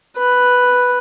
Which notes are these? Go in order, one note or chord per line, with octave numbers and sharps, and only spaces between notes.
B4